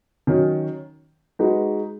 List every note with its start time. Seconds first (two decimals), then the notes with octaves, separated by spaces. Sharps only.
0.27 D#3 F#3 C#4
1.39 G#3 D#4 F#4 B4